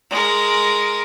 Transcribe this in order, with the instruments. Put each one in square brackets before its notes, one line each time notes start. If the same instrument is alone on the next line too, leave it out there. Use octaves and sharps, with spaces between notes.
[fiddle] G#3 A#4